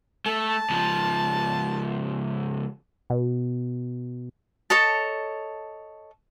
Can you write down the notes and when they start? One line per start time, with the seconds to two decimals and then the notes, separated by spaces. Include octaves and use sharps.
0.26 A3 A5
0.70 C#2 F3
3.10 B2
4.70 A4 C#5 D#5 A5